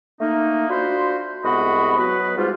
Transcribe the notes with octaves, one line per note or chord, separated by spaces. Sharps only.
A3 A#3 D#4
D4 F4 F#4 C5 B5 C6
C2 G#3 B3 F#4 D#5 B5
F#3 B3 F#4 B4
G#2 G3 F4